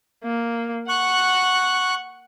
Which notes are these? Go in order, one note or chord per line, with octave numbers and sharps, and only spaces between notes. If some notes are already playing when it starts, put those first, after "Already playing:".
A#3
F#5 C#6 F#6